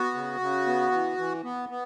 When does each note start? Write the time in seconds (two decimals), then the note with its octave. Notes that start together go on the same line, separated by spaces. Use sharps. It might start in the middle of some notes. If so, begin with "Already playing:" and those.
Already playing: B3 F#4
0.14 C#3
0.40 C#3
0.67 B3
0.92 E3
1.17 E3
1.44 B3
1.69 B3